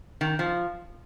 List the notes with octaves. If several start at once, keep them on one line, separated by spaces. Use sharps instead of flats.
D#3
F3